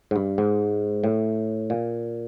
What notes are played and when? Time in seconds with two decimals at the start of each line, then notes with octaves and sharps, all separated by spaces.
0.11 G#2
0.16 G2
0.38 G#2
1.04 A2
1.70 A#2